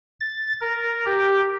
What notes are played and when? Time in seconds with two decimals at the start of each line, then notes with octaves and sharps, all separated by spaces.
0.20 A6
0.61 A#4
1.06 G4